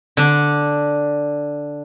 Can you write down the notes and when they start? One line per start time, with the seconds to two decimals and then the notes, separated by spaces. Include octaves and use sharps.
0.17 D3 D4